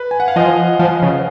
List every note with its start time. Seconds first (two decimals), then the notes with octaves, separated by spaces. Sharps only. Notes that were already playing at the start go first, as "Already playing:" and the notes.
Already playing: B4
0.11 G#5
0.20 F#5
0.28 F5
0.36 F3 D#5
0.79 F3 F5
1.02 C#3